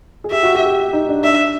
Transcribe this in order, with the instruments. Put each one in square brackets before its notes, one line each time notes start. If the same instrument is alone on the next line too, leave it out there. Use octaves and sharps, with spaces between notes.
[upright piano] G#4
[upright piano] G4 [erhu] E5
[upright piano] F#4
G4
G4
D#4
D4
[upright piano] D4 [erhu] E5